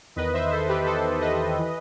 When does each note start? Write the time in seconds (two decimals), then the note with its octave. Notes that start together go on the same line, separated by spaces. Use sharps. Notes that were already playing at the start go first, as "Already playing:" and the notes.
0.16 E2 D#3 B4 D#5
0.33 C5 E5
0.51 A4 C5
0.68 G4 B4
0.86 A4 C5
1.21 B4 D#5
1.58 E3